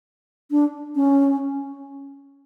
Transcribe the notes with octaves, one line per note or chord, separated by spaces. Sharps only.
D4
C#4